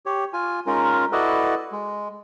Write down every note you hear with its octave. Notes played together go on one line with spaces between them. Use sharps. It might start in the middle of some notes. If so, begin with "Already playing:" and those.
G4 C#5
F4 G#5
G#3 C#4 D#4 F4 A#4
E4 F#4 A4 B4 D5 D#5
G#3